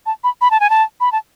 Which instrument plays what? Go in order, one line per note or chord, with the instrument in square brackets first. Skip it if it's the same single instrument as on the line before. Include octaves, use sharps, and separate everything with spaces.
[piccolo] A5
B5
B5
A5
G#5
A5
B5
A5